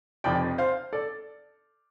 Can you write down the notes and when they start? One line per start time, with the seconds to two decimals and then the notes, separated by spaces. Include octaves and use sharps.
0.24 F1 F2 F3 D5 G5
0.58 C5 F5
0.93 A4 D5